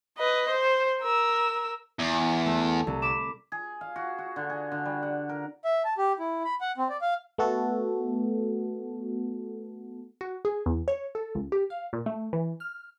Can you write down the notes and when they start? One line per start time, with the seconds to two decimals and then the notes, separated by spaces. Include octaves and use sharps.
0.18 B4 D#5
0.49 C5
1.02 A#4 E6
1.99 E2
2.46 A3
2.87 C2
3.02 B5 D6 E7
3.52 G#4
3.81 F5
3.96 F#4
4.18 F#4
4.36 D3
4.50 G#4
4.72 D3
4.85 G3
5.03 F#5
5.29 A#4
5.65 E5
5.85 A5
5.98 G4
6.19 E4
6.45 B5
6.61 F#5
6.78 C4
6.89 D5
7.01 F5
7.38 A3 B3 F#4 A4
10.21 F#4
10.45 G#4
10.66 E2
10.88 C#5
11.15 A4
11.35 C#2
11.52 G4
11.70 F5
11.93 A#2
12.06 A3
12.33 E3
12.60 F6